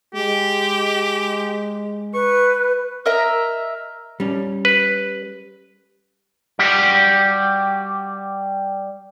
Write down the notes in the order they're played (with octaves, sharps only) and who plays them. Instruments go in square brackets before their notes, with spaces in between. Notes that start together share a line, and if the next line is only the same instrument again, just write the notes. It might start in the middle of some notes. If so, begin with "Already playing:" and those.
[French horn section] G#3 [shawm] G4
[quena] B4 [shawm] C#6
[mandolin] A#4 D#5 E5 A#5
[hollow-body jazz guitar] G3 C#4
[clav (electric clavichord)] B4
[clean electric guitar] G3 F#4 G4